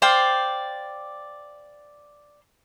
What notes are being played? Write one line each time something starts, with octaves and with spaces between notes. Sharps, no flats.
C5 D5 F5 G5